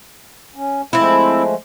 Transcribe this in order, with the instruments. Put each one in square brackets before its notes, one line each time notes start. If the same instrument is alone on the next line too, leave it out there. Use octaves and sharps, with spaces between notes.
[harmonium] C#4
[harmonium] F3 G#3 A3 [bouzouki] C4 E4